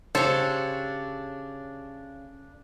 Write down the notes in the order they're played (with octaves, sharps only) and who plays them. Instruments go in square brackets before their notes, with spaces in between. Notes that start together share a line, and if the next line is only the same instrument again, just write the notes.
[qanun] C#3 G4 [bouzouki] D4 C#5 [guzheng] A4 [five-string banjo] C5